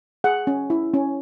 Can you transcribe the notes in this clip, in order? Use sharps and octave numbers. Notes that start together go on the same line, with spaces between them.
G#4 F#5
C#4
E4
C#4